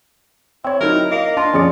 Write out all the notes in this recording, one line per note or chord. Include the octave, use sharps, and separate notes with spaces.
C4 E4 C#5
F#3 D#4 E4 A#4
A#3 D#5
D4 F4
F2 F3 C#4 G#4 D5 C#7